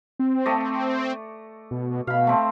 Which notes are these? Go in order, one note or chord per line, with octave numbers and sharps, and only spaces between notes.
C4
A3 D5 D#5
B2
B2 F5 B5
A3 C4